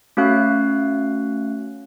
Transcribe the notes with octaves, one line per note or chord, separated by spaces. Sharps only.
A3 C#4 F#4 F5 F#6